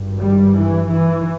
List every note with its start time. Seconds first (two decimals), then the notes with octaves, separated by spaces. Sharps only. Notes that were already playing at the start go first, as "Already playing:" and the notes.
Already playing: G#1 G2
0.20 G3
0.54 E3
0.89 E3